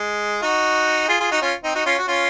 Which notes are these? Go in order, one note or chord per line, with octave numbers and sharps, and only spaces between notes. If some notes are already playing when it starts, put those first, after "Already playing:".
Already playing: G#3
D#4 F#4
F4 G#4
F4 G#4
D#4 F#4
C#4 F4
C4 D#4
D#4 F#4
C#4 F4
F#4
C#4 F4